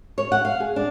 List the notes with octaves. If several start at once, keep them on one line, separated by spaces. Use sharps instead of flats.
C#5
F#5
F5
G#4
D4